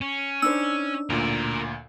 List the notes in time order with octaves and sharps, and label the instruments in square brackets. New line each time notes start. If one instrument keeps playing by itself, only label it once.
[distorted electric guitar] C#4
[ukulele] D4 D#4 C5 [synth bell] E6
[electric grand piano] D2 A#2 [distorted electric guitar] A#4 D5